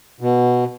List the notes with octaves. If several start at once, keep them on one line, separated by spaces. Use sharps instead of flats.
B2